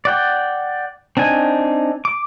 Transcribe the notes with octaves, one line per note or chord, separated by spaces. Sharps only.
D5 F#5 G5
C4 D4 D#4 G#5
D6